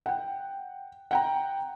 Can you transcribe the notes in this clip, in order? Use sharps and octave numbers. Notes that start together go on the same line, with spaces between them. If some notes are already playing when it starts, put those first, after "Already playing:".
F#5 G5
F#5 G5 A#5